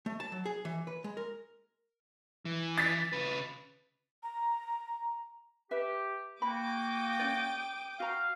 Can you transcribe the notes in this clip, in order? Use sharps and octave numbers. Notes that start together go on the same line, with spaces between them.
A3
A5
F#3
G#4
E3
B4
G#3
A#4
E3
A6 B6
C#3 B4
A#5
G4 B4 E5
A#3 F#4 G5 B5 D6 D#6
C#4 D#4 D5
F#4 F5 A#5